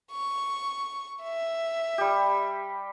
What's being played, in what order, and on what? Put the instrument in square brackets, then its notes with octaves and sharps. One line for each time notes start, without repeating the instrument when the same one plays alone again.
[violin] C#6
E5
[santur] G3 G4